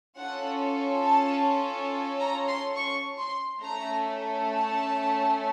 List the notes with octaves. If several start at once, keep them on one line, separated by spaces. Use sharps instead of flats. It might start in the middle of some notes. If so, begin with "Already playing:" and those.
C#4 F4 A4 F#5
A5
A#5
C6
C#6
C6
A3 C#4 A4 A#5
A5